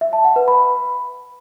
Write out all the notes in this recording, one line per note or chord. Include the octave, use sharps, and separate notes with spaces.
E5
A5
F#5
B4
B5